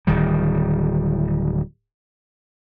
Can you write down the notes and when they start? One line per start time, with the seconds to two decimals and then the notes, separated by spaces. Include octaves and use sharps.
0.07 D1 D#3 G3